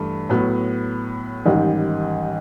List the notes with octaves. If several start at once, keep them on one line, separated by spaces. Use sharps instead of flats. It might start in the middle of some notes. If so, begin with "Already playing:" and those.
Already playing: G2 E3 A3
A2 F#3 B3
A1 G#2 D#3 G3